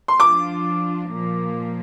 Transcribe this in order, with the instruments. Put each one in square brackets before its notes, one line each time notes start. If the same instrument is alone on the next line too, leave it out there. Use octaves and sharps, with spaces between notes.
[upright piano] C6
[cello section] F3 D4 F4 [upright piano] D6
[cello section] A#2 F3 A#3